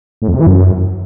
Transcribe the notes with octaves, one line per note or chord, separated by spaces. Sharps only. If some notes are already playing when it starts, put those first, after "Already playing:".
A2
F2
C3
E3
F#2